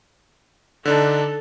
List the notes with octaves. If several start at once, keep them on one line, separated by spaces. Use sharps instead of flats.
D3 D4 D#4 A4